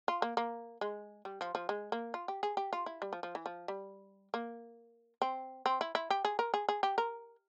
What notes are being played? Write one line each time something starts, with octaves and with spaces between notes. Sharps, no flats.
F4
A#3
A#3
G#3
G3
F3
F3
G#3
A#3
F4
G4
G#4
G4
F4
E4
G3
F3
F3
E3
F3
G3
A#3
C4
C4
E4
E4
G4
G#4
A#4
G#4
G#4
G4
A#4